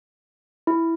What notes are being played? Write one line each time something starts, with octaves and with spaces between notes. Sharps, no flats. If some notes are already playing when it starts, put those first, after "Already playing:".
E4